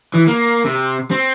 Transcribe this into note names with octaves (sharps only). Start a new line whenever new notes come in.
E3
A#3
C3
C4